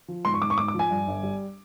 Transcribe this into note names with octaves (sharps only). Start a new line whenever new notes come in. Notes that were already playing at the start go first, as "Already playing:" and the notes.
F3
G#2 C6
C#6
G#2 D6
C#6
G#2 D6
D6
F3
G#5
G2
G1
G3